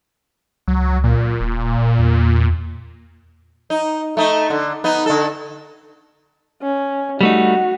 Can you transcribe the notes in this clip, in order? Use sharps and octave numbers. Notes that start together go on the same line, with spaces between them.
C#2 F#3
A#2
D#1
E2
D#4
A3 D#4
D3
B3 D#4
D3 A4
C#4
G3 A3 D#4 F#4